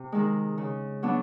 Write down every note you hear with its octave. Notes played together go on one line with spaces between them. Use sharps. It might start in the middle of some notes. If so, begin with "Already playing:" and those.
Already playing: C3
D#3 G#3
C#3
F#3 B3 D4